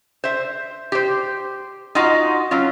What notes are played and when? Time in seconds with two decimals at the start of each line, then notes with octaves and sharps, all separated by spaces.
0.24 C5 E5
0.92 G4 C5
1.95 D#4 F4 F#4 D#5
2.51 F#3 C#4 F4